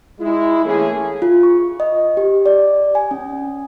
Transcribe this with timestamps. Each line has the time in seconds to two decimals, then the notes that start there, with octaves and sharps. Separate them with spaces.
0.21 G#3 E4
0.64 E3 A3 A#3 C#4 E4 G#4
1.22 F4
1.43 C#6
1.80 D#5
2.17 G4
2.46 D5
2.95 G#5
3.11 C#4